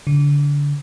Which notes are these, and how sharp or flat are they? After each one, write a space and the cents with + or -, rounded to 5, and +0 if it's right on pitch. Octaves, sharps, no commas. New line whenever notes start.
D3 -30